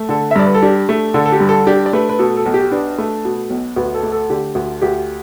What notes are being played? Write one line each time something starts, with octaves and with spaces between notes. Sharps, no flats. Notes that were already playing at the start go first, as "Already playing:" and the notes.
Already playing: A3
D3 A4
E5
G2 D5
B4
A4
D4 G4
A3
D3 A4
A4
G4
G2
A4
D4 G4
D5
A3 B4
B4
B2 A4
A4
B1
G4
D4 B4
A3
B2
B1
D2 B4
A4
A3
A4
D3 G4
D2
D2 G4